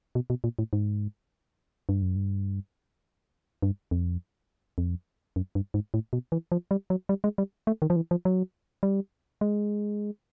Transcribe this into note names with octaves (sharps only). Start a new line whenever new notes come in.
B2
B2
A#2
A2
G#2
G2
F#2
G2
G2
F2
F2
F#2
G2
G#2
A2
B2
E3
F3
G3
F#3
G3
G#3
G3
A3
D#3
F3
E3
F3
F#3
G3
G#3